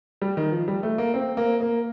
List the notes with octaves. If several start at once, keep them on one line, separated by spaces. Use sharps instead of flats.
G3
D#3
F3
G3
A3
A#3
C4
A#3
A#3